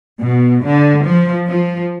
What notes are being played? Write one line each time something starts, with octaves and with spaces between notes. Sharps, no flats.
B2
D3
F3
F3